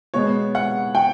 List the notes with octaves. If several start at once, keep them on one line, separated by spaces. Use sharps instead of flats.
B2 G#3 B3 C#5
F#5
G5